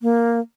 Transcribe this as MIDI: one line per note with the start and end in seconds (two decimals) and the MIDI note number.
0.01 0.39 58